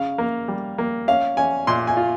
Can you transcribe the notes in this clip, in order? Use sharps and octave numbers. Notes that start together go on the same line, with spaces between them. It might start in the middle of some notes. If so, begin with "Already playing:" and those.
Already playing: C#3 F5
A#3
G3
A#3
C#4 F5
C#4 G#5
A#2 C6
G#5
F4